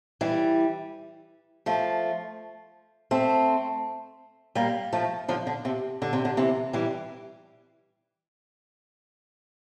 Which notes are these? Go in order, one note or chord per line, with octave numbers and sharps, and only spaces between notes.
E3 G3
F3 A3
A3 C4
G3 A#3
F3 A3
D3 F3
D3
C3
D3
C3
D3
C3 E3
E3 G3